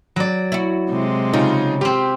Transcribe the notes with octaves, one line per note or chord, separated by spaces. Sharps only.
F#3 D5
E4 F#4
C3 G#3
C#3 D#4 F4
C4 F4 G4